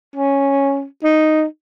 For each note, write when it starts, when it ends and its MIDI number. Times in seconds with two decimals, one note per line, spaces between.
0.16 0.85 61
1.04 1.44 63